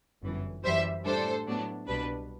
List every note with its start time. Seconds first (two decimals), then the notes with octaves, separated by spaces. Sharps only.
0.23 G1 F#2 E3
0.64 F#2 E3 G3 C5 E5
1.05 A2 G3 D4 A4 C5
1.47 A2 F#3 B3 D4
1.88 C2 B2 G3 D4 B4